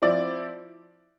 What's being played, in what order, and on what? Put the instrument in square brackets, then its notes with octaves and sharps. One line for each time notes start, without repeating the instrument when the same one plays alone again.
[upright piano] F3 C4 E4 D5